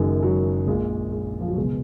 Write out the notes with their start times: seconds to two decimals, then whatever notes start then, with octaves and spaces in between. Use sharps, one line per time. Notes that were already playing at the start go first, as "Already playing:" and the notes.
Already playing: F#1 F#2 D#3 G#3
0.23 F#3
0.67 A#1 A#2 G#3
1.12 G#3
1.41 F3
1.48 F#3
1.56 C#2 B2 G#3